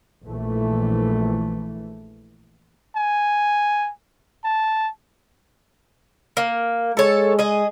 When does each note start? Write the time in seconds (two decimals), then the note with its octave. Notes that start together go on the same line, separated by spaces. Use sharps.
0.24 A#1 E3 A3
2.96 G#5
4.44 A5
6.37 A#3
6.97 G#3 A4 C#5
7.39 G#4 D#5